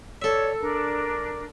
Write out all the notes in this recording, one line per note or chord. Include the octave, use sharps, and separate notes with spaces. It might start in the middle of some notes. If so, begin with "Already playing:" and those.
A4 C#5 D5 E5
D4 A#4